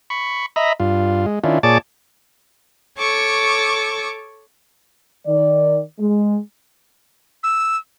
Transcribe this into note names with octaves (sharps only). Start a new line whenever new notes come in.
B5 C#6
D#5 E5 A#5 B5
G2 F4
G#3
D#3 C#4 D4 E4 F4
A#2 G#4 C#5 D5 A5 D6
A4 C#5 C#6 D6
D#3 D5
G#3
E6